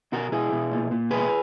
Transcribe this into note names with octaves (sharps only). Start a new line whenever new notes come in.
B2 F#4 A#4
B2 E4 G#4
B2
A#2
A#2
B2 G#4 B4